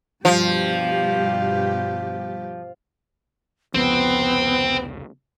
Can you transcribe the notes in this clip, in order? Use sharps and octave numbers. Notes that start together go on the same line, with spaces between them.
G2 B2 F3 G4
F1 C#2 F3 B3 C4